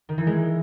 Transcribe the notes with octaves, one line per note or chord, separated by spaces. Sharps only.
D#3
E3
G#3